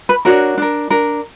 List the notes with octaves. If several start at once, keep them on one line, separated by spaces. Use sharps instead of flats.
B4
D4 F#4 A#4 C#5
D4 A#4
D4 A#4